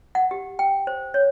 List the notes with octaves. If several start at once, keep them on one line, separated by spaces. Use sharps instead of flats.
F#5
G4
G5
C5
C#5